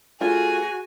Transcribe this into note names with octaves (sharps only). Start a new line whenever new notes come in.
A3 F4 F#4 G#4 G#5